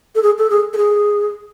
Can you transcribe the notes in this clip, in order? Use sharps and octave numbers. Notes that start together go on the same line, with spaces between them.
A4
G#4
A4
G#4
A4
G#4